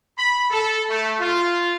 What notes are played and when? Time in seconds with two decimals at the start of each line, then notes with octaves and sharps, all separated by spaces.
0.17 B5
0.50 A4
0.90 A3
1.20 F4